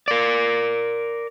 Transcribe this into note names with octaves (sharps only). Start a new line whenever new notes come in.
A#4 D5